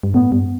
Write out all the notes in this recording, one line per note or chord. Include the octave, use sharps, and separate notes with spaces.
G2
A2 B3
G2